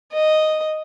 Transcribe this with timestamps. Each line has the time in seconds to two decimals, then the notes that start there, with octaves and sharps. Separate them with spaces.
0.13 D#5